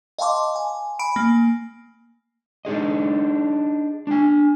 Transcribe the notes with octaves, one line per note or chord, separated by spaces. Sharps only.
D#5 F5 G5 A5 C6 D6
G#5
G#5 B5 D7
A#3
D4 D#4 G#4 D#5
D4 G#5